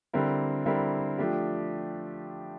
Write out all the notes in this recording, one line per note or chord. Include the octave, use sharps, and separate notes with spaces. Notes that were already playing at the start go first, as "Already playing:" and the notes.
D3 G3 C4 E4 A#4
D3 G3 C4 E4 A#4
F3 A3 D4 G4